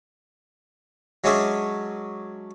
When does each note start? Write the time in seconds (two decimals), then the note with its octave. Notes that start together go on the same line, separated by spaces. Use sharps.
1.24 F#3 G#3 C#4 D4 G#4 E5